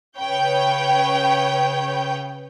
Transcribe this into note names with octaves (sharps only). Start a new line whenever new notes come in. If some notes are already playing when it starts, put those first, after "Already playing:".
C#3 B4 C#5 G5 G6